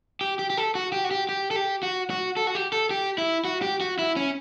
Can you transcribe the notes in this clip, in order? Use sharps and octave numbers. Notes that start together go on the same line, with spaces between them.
G4
G4
G4
A4
F#4
G4
F#4
G4
G4
A4
G4
F#4
F#4
A4
F#4
G4
A4
G4
E4
F#4
G4
F#4
E4
C#4